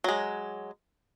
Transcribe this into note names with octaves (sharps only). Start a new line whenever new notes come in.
F#3 G#3